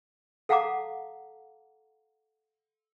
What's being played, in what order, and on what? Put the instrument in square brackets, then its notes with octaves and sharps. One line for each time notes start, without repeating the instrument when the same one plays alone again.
[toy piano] A4 F5 F#5 A5 A#5 D6